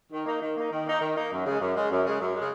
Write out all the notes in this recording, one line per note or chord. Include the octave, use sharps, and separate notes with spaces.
D#3
A#3 D#4
D#3
A#3 D#4
D#3
A#3 D#4
D#3
A#3 D#4
F#2
C#3 G#3
F#2
C#3 G#3
F#2
C#3 G#3
F#2
C#3 G#3